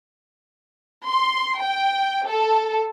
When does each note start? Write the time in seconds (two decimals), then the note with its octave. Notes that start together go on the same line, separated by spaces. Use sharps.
1.07 C6
1.61 G5
2.27 A4